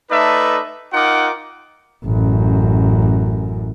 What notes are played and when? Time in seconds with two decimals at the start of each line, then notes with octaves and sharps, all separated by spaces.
0.11 A3 D#4 A4 B4 D5 E5
0.93 D#4 F4 A#4 F#5 G5 D6
2.05 A1 F#2